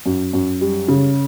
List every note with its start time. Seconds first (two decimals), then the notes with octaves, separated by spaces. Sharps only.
0.06 F#2
0.33 F#2
0.61 G3
0.88 C#3